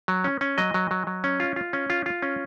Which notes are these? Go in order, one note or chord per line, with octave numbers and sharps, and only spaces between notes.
F#3
C#4
C#4
F#3 D#5
F#3
F#3
F#3
C#4
F4
F4
C#4
F4
F4
C#4